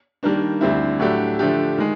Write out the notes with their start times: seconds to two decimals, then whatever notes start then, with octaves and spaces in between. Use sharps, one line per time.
0.23 D#3 G3 A#3 D4
0.61 D2 D3 G3 C4 E4
0.99 A2 F#3 A3 D4 G4
1.39 D3 F3 A3 D4 G4
1.78 D#3 G#3